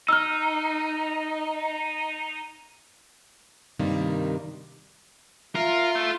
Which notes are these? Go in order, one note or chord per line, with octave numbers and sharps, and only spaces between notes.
D#4 E6 F6
G2 C3 D#3 G3 A#3
F4 A#4 E5
A3